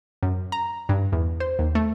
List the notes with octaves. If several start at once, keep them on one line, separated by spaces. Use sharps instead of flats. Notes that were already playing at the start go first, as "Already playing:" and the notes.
F#2
A#5
G2
E2
C5
D#2
A3